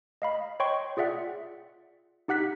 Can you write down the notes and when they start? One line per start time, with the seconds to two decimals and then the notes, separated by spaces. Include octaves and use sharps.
0.22 D#5 F5 B5
0.60 C#5 D#5 G5 C6 C#6
0.97 F4 G#4 D5 E5 F#5
2.28 D#4 G4 F#5 F#6 B6